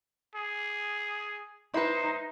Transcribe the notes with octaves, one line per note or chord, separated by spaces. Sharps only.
G#4
D#4 E4 B4 C5